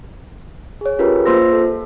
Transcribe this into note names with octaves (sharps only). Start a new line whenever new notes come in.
G#4 C#5
C#4 F4 G4 G#4 A#4 B4
A#3 F4 C5 C6 E6 A#6
A4